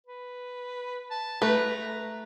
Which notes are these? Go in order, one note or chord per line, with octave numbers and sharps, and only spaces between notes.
B4
A5
A3 B4 A#5